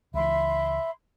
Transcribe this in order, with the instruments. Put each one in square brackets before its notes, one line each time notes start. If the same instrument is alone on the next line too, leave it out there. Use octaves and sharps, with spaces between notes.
[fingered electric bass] C#2 E3 [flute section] E5 B5 C6